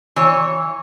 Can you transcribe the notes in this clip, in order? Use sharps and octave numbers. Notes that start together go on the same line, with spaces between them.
E3 C#5